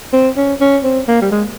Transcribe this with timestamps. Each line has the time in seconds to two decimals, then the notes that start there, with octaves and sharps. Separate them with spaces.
0.13 C4
0.37 C#4
0.61 C#4
0.84 C4
1.08 A#3
1.21 G3
1.31 G#3